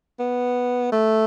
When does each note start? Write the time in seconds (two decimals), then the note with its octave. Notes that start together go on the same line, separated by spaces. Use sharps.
0.19 B3
0.92 A3